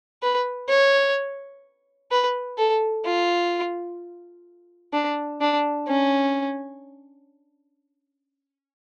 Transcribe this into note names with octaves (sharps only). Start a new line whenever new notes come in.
B4
C#5
B4
A4
F4
D4
D4
C#4